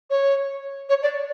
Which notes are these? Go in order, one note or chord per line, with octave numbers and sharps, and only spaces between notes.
C#5
C#5
D5